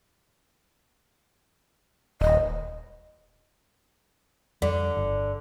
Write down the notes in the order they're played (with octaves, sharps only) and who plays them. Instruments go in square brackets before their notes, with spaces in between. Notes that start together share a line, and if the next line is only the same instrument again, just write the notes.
[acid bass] D#1 [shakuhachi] D#5
[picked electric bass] F2 G3 [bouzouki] D3
[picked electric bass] G1